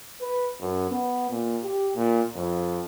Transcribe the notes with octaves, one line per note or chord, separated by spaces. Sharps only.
B4
F#2
B3
A#2
G4
A#2
F2